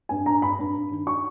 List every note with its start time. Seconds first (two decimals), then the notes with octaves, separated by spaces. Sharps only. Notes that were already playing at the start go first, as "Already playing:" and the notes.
0.09 G2 G#5
0.26 G2 A#5
0.42 G2 B5
0.59 G2
0.75 G2
0.91 D#3
1.07 C#6